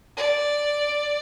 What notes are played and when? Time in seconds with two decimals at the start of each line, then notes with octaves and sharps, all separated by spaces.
0.17 D5